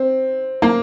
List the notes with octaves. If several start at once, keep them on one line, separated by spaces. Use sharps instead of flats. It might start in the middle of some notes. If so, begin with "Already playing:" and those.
Already playing: C4
A#3